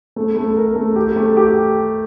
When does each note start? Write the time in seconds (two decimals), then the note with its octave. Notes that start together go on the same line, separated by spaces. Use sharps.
0.16 A3
0.37 A3
0.56 A#4
0.76 A3
0.96 G4
1.16 A3
1.37 G4